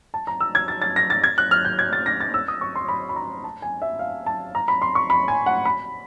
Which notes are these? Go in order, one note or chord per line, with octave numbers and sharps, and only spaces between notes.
A5
A#5
E6
G#6
A6
A6
A#6
A6
G#6
F#6
F6
G6
G#6
A6
A#6
A6
E6
D#6
C#6
C6
B5
B5
A#5
A5
G#5
E5
F5
A5
A#5
B5
C6
C#6
B5
G#5
F#5
B5